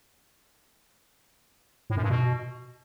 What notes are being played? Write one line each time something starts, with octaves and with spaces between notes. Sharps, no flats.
A2
F#2
G2
B2